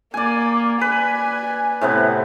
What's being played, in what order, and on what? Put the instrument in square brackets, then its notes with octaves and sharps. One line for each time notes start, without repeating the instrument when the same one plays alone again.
[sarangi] A#3 [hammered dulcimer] D5 G#5
[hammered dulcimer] B4 [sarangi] G#5
[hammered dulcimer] A2 C3 B3